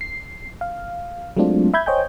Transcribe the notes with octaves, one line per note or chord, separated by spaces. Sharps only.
C7
F5
F#3 G#3 A3 C4 D4 F4
E5 B5 G6 G#6
C5 C#5 D#5 G5 G#5 G6